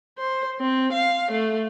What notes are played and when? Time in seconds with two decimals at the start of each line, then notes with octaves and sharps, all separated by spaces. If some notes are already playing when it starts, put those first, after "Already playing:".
0.18 C5
0.60 C4
0.93 F5
1.31 A3